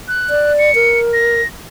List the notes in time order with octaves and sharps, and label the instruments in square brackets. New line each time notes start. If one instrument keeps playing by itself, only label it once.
[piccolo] F#6
[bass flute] D5
[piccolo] C#7
[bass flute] A#4
[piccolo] A#6